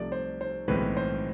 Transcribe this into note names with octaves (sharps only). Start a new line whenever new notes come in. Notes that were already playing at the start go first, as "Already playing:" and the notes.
Already playing: C2 C3 F3 A3 D5
C5
C5
B1 A2 E3 G#3 C4 B4
C5